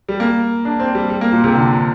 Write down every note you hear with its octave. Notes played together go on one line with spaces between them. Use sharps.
G3
A#3
D4
C4
G3
G3
A#3
A#2
C3
D3